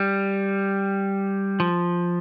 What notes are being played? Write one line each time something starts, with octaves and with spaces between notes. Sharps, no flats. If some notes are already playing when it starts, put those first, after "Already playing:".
Already playing: G3
F3